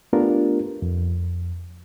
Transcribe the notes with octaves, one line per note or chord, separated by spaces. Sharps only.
A3 B3 D4 F4 G4 A#4
F2